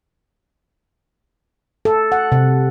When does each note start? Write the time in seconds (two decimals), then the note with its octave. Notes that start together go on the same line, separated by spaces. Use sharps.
1.85 A4
2.12 F#5
2.32 C3